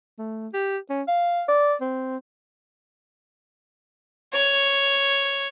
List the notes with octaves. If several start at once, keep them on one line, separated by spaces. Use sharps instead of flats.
A3
G4
C#4
F5
D5
C4
C#5